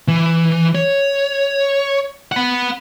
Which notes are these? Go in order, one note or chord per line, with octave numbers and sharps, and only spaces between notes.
E3
C#5
F#5 B5